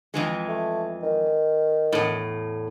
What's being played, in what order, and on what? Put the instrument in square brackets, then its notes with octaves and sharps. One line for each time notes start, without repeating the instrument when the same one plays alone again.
[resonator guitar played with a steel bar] F2 E3 G#3
[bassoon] A3
D#3
[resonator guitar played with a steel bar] E2 A2